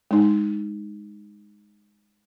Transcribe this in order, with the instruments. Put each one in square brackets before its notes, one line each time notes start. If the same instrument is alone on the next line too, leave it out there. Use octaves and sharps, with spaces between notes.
[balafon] G#3 D#4